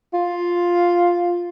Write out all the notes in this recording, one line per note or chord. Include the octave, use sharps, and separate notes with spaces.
F4